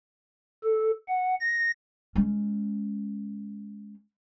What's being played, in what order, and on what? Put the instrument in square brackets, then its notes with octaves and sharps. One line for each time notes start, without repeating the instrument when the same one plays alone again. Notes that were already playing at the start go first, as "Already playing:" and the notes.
[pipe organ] A4
F#5
A#6
[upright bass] G#3 C#4